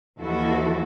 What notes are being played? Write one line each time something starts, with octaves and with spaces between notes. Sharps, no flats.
D#2 E3 F3 E4 F#4 A4